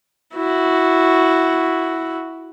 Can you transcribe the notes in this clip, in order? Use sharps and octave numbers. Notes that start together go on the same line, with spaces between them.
E4 F#4